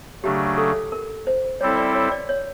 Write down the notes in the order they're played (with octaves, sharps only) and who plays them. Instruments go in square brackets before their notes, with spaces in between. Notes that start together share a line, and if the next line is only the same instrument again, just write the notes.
[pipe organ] C#3 F#3 A3 D4 [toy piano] G4
[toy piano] A4
A#4
C5
[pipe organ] G3 C4 E4 A4 [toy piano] C#5
[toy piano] D5
C#5
D5
C#5